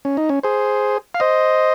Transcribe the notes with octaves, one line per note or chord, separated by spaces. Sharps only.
C#4
D#4
C#4
G#4 C5
F5
C5 D#5